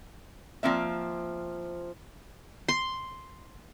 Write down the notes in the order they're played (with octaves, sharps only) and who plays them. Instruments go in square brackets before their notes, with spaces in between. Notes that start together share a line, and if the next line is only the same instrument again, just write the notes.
[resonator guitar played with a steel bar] F3 A#3 C4 E5
[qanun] C6